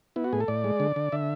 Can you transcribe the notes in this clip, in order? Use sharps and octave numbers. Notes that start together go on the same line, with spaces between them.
B3 E4
F#4
A2 G#4
A4
A2 D5
G#3
D3
D3
D3 E5